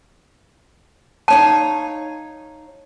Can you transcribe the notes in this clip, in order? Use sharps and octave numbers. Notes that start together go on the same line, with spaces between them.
D#4 C#5 F5 A5